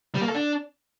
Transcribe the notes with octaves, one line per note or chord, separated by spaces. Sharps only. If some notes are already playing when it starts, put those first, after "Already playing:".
G3
A#3
A4
D4